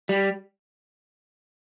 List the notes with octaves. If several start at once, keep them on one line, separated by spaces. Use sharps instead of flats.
G3